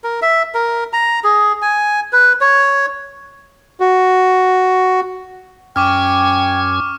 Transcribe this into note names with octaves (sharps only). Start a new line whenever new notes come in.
A#4
E5
A#4
A#5
G#4
G#5
B4
C#5
F#4
F#2 C#4 G5 C#6 D6 F6 G#6